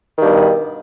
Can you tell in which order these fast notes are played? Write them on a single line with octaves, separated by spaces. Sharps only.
D#3 G2 B2